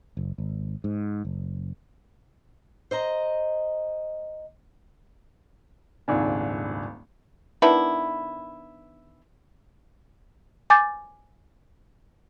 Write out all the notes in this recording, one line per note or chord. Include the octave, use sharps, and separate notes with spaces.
F#1
G#1
G#2
F#1
C5 D#5 A#5
D#1 G#1 C#2 G#2 D4 G#5
D#3 B3 D4 E4
G#5 D6 G6 A6